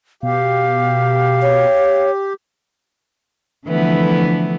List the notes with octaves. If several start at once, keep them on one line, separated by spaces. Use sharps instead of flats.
B2 G4 F5
C#5
D3 E3 F3 A3 B3 E4